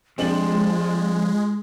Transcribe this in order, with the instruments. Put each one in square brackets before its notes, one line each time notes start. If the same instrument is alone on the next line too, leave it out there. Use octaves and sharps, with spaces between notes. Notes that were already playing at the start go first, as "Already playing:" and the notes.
[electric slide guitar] F3 [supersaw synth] G#3 [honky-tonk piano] C4 D4 F#7 [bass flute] F4